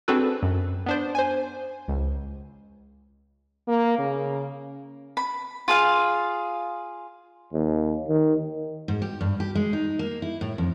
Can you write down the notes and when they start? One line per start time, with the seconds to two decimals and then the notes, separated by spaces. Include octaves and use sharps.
0.08 C4 D4 F#4 G#4 A4 B4
0.43 F#2
0.86 B3 D4 C5
1.15 C5 G#5
1.88 C#2
3.68 A#3
3.98 C#3
5.17 B5
5.68 F4 G#4 F5
7.53 D#2
8.08 D#3
8.88 G#2
9.02 G4
9.21 G2
9.40 G4
9.55 G#3
9.73 D#4
9.99 A#3
10.22 E4
10.41 A2
10.58 F2